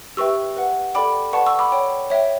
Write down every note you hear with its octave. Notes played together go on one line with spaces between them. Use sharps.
G4 B4 E5 G5 C#6 E6
B4 F#5
A4 D5 G5 B5 D6
B4 D5 F#5 A5 C#6
C#6 E6
B5 D6
C#5 G5
C#5 E5 G5